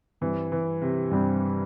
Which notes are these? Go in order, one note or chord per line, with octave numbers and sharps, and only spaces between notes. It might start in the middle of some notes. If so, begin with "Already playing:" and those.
G2 E3 G3 C4
E3
C3
G2 G3 C4